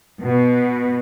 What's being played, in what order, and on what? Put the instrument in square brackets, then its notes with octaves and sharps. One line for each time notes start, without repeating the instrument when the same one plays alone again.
[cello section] B2